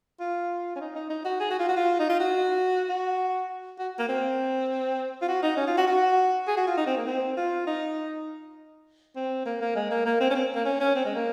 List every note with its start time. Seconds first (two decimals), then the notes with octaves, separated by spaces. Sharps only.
0.20 F4
0.76 C#4
0.80 D#4
0.95 D#4
1.10 D#4
1.25 F#4
1.40 G#4
1.50 F#4
1.59 F4
1.69 F#4
1.77 F4
2.00 D#4
2.09 F4
2.20 F#4
2.89 F#4
3.79 F#4
3.99 A#3
4.09 C4
5.22 F4
5.28 F#4
5.43 D#4
5.57 C#4
5.67 F4
5.78 F#4
5.88 F#4
6.47 G#4
6.57 F#4
6.67 F4
6.77 D#4
6.87 C4
6.98 A#3
7.07 C4
7.37 F4
7.67 D#4
9.16 C4
9.46 A#3
9.61 A#3
9.76 G#3
9.91 A#3
10.06 A#3
10.20 C4
10.30 C#4
10.35 C4
10.55 A#3
10.65 C#4
10.80 C#4
10.95 C4
11.05 G#3
11.15 A#3